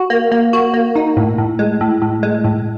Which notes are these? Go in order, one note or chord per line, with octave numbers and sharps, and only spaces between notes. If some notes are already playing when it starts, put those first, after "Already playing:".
Already playing: F#4
A#3
A#3
F#4
A#3
D#4
A2
A2
G#3
A2
A2
G#3
A2